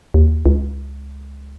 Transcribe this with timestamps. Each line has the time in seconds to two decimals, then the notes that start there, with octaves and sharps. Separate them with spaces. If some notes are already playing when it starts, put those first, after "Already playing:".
0.14 D#2
0.46 C#2